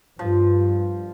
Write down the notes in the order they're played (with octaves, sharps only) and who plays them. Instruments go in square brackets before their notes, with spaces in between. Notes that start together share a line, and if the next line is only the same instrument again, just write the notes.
[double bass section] G2 [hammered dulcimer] F3